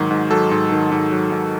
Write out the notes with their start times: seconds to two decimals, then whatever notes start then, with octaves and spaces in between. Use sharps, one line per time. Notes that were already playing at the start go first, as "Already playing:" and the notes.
Already playing: G#2 D#3 F#3
0.11 G#2
0.31 F#3 A4
0.51 G#2
0.72 D#3
0.92 G#2
1.12 F#3
1.32 G#2